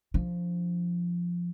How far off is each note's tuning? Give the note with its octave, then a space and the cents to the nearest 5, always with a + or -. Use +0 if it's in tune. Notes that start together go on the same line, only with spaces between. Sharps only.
F3 +0 D4 +0